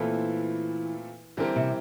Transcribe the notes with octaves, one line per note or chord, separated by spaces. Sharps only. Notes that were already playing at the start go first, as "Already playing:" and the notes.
Already playing: A#2 E3 A3 C4 F4 A4
D3 E3 G3 C4 G4 A#4
C3